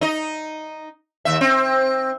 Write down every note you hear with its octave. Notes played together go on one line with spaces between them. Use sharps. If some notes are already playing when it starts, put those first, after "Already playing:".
D#4 D#5
D#2 E5
C4